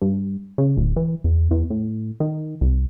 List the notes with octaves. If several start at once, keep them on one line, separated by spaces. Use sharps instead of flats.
G2
C#3
D1
E3
E2
E2
A2
D#3
C2